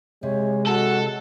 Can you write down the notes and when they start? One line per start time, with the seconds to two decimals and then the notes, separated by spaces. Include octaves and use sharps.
0.23 C3 G#3 C#5
0.66 F#4 A4